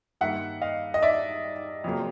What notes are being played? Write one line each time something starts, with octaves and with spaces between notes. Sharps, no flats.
G2 D#3 G3 A#3 E5 F#5
D#5 F5
D#5
D5 E5
F2 C#3 F#3 A#3